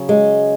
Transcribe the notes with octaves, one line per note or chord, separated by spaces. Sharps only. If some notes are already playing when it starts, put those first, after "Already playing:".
Already playing: C#3 F#3
G#3